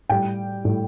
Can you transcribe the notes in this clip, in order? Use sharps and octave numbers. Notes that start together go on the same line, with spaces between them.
A2 G3 G5
A2 G3